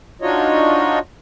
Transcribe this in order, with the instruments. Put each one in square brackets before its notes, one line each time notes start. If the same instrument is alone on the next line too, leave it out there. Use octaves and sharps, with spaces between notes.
[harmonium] D4 D#4 F4 F#4 C#5 D#5